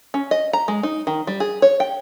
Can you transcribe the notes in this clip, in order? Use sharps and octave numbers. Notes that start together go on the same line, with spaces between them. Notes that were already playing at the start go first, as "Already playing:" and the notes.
C#4
D#5
A#5
G#3
D#4
D#3
G3
G#4
C#5
G5